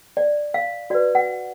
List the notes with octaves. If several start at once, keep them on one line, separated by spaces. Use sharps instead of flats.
D5
F5
F#4 B4 D5
F#5